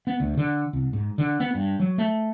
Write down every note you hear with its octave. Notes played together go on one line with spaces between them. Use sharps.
B3
D2
D3
C2
G#2
D3
B3
G2
F#3
A3